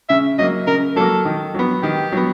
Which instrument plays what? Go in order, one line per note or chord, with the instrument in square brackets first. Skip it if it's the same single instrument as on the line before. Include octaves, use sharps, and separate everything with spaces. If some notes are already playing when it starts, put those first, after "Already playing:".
[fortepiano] C#3 [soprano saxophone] E5
[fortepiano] F#3 A#3 [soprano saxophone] D#5
[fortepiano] C#3 [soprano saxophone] A#4
[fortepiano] F#3 A#3 [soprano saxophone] A4
[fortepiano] D#3
F#3 B3
[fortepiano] D#3 [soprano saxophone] G4
[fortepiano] F#3 B3